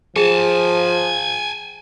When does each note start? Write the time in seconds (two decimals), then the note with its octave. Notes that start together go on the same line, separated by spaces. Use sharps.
0.16 F3 G#4 G#5 A5